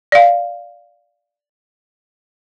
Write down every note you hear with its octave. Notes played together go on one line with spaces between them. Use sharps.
D5 F5